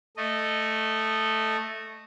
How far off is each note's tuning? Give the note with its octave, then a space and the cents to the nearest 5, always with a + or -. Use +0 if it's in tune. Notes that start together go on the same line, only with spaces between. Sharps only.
A3 +0 D#5 -15